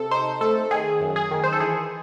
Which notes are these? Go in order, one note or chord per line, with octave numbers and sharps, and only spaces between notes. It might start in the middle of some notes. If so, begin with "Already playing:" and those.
Already playing: C3 A4
D#4 C5
A3 A4
D#3 G#4
F#2
G#4
D#3
C5
A4
E3 G#4